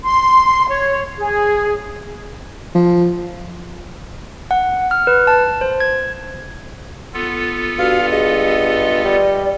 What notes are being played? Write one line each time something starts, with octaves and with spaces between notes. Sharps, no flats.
C6
C#5
G#4
F3
F#5
F6
B4
A5
C5
G#6
B3 F4 A4
G2 F#4 F5
G#4 D#5
G3 D5